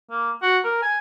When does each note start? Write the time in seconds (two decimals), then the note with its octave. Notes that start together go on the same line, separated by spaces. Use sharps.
0.10 A#3
0.42 F#4
0.64 A#4
0.82 G#5